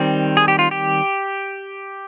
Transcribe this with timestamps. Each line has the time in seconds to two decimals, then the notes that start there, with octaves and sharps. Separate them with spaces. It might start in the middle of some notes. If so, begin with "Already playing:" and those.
Already playing: D#3 G3 C4
0.37 G#4
0.48 G4
0.59 F4
0.71 G4